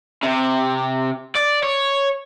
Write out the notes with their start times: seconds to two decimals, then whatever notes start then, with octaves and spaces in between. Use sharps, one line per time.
0.23 C3
1.35 D5
1.63 C#5